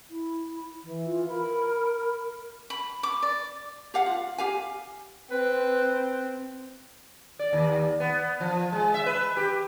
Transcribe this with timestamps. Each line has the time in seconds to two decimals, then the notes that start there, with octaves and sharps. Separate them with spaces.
0.10 E4
0.84 E3
1.05 F4
1.29 A#4 B5
1.73 B5
2.70 B5
3.03 D6
3.22 D5
3.94 G4 F5 F#5
4.06 F4
4.38 G4 F5 G#5
5.31 C4 B4
7.39 D5
7.53 D#2
8.00 B3
8.40 F3
8.72 G#3
8.94 E5
9.06 B4
9.37 G4